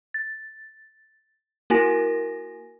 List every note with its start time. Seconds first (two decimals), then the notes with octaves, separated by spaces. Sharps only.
0.14 A6
1.70 A#3 E4 F#4 A#4 G#5 A#6